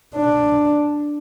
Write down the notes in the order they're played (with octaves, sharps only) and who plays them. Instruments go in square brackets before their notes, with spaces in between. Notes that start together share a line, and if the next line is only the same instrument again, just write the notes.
[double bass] D4